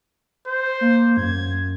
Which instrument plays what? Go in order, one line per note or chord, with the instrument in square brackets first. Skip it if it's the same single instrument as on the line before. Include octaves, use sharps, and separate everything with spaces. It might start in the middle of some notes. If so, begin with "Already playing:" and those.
[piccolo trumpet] C5
[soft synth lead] A#3
[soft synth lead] F#2 [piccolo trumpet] G#6